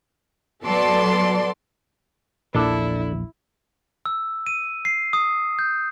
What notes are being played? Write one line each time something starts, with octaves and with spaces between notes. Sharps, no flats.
F#3 B3 A4 D5 C6
A#1 E2 A#2 D4 E4 A4
E6
D#7
C7
D#6
G6